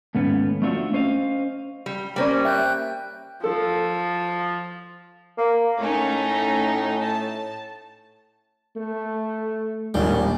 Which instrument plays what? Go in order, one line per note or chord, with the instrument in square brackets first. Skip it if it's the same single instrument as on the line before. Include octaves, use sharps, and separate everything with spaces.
[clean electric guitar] D#2 G#2 A3 B3 C#4
A3 C4 D4 F4 F#4 E5
C#4 C5 D#5 F5
[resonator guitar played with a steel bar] G3
[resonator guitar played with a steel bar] G3 A#3 C#4 [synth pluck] C5 D5 G5
[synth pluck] E5 [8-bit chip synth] G5 F#6 G6
[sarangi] F3 [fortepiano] A4
[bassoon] A#3
[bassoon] A2 [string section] A3 C#4 D#4
[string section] A5
[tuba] A3
[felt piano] D#1 [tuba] A#1 [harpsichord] G3